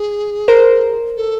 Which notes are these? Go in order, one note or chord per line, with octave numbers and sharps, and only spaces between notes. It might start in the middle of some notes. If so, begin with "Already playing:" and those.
Already playing: G#4
A#4 C5
A4